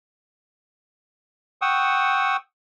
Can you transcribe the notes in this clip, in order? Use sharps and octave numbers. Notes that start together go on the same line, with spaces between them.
F#5 G5 C#6 D#6 E6